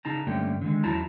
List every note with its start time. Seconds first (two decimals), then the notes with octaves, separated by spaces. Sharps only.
0.05 C#3 D#4 A5 A#5
0.27 G2 D3 A3 A#3 C#4 G4
0.61 D3 D#3 F3 G#3
0.84 E2 F#3 E4 A5 A#5